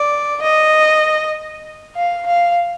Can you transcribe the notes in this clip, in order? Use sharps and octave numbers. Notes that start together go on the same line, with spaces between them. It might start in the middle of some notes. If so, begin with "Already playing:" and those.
Already playing: D5
D#5
F5
F5